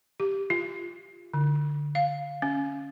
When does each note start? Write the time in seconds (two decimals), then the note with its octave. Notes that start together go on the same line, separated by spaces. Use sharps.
0.20 G4
0.50 F4
1.34 D3
1.95 F5
2.42 C#4